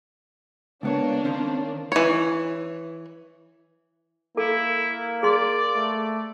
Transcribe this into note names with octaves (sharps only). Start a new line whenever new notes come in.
C#2 A#3 B3 D4 C#5
D#3 C4 C#4
E3 C#5
A#3 E4 A4
G#4 D5 C6
A3